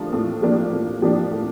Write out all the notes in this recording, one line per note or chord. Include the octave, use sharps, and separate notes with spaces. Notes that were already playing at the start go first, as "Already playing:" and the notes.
Already playing: A2 F3 A#3 D4 G4
A2
F3 A#3 D4 G4
A2
F3 A#3 D4 G4
A2